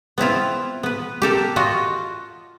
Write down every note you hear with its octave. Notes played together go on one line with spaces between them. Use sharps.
B3 C4 E4 F4
B3 B4
G4 A4 A#4
F4 F#4 D#5